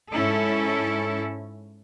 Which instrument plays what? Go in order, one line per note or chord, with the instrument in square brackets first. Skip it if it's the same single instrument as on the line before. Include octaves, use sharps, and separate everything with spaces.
[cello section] G#2 C#4 E4 A4